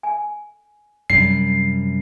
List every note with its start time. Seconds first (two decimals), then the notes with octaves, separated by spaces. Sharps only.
0.03 G#5
1.10 F#2 C3 G3 C7